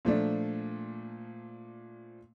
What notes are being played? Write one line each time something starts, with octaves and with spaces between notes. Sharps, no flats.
A#2 F3 A3 D4